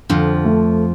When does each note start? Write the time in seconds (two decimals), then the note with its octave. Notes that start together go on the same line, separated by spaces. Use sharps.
0.09 F2 D3 F3
0.45 A3